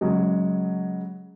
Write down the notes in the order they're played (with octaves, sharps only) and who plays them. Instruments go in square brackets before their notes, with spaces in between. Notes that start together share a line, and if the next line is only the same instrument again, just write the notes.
[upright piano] C#3 F#3 G#3